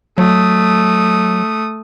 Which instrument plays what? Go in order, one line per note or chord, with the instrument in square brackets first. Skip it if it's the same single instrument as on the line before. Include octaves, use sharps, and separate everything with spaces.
[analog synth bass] F#3 [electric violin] A3 D#6